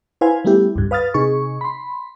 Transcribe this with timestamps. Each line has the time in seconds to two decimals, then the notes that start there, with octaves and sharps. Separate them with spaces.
0.21 E4 B4 C5 F5 G#5
0.45 G3 A3 B3 E4 G4
0.76 C#2 G2
0.91 B4 F5 D#6 F6 A6
1.14 C3 D#4 G#4 C#6
1.61 B5 C6